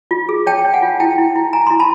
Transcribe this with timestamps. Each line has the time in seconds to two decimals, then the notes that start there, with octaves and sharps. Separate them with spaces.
0.11 F4
0.29 G#4
0.46 C#5 G5 A5
0.65 C#5
0.74 F#5 G#5
0.82 F4
1.00 E4 G5 A5
1.18 E4
1.35 E4
1.53 E4 G#5 A#5
1.66 E4 A#5 C6
1.79 A5 B5